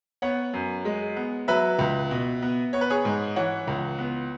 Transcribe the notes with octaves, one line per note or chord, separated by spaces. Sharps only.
B3 C#5 F#5
F#2
G#3
B3
F#3 B4 E5
C#2
B2
B3
B3 C#5
B4
G#4 C#5
G#2
E3 C#5 F#5
C#2
B3